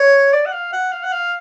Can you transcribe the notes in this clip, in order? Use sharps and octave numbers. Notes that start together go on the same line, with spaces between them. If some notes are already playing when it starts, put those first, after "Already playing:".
Already playing: C#5
D5
F#5
F5
F#5
F5
F#5
F5